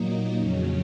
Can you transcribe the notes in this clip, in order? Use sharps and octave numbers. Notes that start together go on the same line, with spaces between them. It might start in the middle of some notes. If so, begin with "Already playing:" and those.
Already playing: A#2 F#3 A#3 D#4
F2 C#3 F#3 C#4